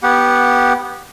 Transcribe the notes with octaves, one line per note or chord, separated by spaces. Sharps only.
B3 G4 F#5